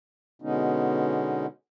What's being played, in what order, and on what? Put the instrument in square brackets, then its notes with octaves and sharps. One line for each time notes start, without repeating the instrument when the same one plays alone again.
[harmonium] B2 D3 G#3 B3 C#4 D#4